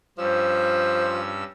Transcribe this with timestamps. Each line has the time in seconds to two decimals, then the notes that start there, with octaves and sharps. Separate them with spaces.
0.18 G2 F3 C#4 C5 E6